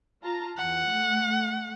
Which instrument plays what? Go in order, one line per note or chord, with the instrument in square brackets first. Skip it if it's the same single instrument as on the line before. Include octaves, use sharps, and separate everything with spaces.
[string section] F4 A5 A#5
[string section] E2 [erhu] F#5
[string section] A3